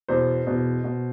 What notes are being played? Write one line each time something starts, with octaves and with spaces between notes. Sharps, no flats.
E2 B2 C5
E2 B2
B2